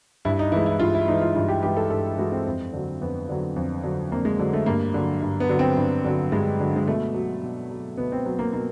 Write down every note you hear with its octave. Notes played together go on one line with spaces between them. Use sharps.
G2 E4
D#4
E3 G#3 E4
E4
G2 F4
E4
E3 G#3 D#4
F4
G2 F4
G4
E3 G#3 G4
A4
G2 A4
E3 G#3 F#4
C4
F2
D3 F#3
F2 B3
D3 F#3
F2
D3 F#3
F2 A#3
G#3
D3 F#3
A3
G2 A#3
D3 F#3
G2
B3
D3 F#3
C4
G2
D3 F#3
G2 G#3
D3 F#3
G#3
B2 A3
F#3
B2
F#3
B2 B3
C4
F#3
A#3
B2 A#3